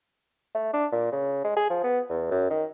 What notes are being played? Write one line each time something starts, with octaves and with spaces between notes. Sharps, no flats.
A3
D4
A#2
C#3
G#3
G#4
F3
B3
E2
F#2
D#3